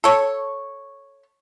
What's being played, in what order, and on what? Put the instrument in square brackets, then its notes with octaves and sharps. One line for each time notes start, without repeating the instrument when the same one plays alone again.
[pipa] A4 C#5